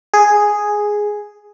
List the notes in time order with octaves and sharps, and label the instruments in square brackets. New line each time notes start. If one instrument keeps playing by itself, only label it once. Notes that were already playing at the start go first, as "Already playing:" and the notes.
[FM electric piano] G#4